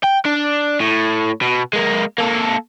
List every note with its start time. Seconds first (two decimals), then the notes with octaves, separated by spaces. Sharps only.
0.04 G5
0.26 D4
0.80 A2
1.41 B2
1.73 G#3 A#3
2.18 A#3 A4